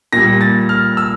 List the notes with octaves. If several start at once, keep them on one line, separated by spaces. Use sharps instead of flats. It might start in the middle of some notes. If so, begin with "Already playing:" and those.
A#2 G3 A#6
A6
F6
E6